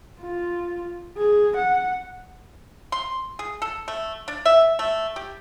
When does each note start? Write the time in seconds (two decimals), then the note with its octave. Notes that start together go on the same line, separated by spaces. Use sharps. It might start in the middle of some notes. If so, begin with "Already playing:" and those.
0.20 F4
1.17 G#4
1.57 F#5
2.92 C6
3.39 G#4
3.62 A4
3.88 A3
4.28 D4
4.45 E5
4.79 A3
5.16 G4